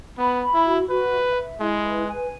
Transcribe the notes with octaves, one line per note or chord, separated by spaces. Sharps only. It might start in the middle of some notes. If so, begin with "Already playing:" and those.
B3 B5
B5
E4
F#4
F#4 B4
E5
E5
G#3 E4
B4
G#5